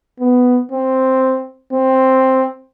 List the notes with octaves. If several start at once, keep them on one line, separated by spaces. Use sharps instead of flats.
B3
C4
C4